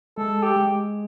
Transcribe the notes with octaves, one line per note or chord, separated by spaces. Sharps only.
G#3 A4
G4
G#3